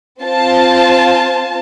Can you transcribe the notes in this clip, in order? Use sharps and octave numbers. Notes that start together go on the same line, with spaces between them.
C4 F4 C5 A5